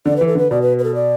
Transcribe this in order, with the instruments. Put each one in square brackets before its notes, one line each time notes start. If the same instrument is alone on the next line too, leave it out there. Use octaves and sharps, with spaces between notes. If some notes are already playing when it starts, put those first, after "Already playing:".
[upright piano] D3 [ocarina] D5
[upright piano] E3 [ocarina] B4
[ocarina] A4
[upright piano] D3 [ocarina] B4
[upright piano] B2 [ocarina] D5
[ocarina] B4
B4
A4
D5